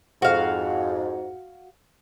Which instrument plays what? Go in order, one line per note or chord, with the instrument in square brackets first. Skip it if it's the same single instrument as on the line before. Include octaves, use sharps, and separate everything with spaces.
[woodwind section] F2 G#2 [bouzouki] F#4 F5